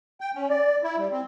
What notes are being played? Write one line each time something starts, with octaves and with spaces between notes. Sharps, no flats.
G5
C#4
D5
E4
G3
C4